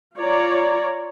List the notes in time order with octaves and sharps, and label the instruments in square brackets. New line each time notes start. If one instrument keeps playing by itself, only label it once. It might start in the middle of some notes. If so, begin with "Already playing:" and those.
[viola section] F4 C#5 D5 A#5